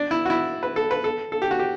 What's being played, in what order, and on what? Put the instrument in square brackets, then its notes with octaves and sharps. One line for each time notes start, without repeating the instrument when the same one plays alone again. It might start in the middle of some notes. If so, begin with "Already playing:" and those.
Already playing: [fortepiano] D4
E4
F#4
E4
B4
A4
B4
A4
A4
G4
F#4
G4